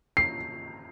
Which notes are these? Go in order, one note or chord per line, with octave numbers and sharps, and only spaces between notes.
C7